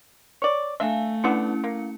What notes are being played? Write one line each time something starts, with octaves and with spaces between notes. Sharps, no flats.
C#5 D5
A3 D4 E5 F5 G#5
D3 B3 C#4 D4 E4 C#7
A#3